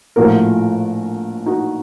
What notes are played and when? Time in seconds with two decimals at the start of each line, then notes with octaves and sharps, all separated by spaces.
0.16 A#1 A2 F3 F#4 A#4
1.46 D#4 F#4